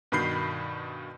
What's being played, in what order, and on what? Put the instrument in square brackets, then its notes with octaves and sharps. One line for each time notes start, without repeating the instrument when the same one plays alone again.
[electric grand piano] G2 B2 D#3 B5 G6 C7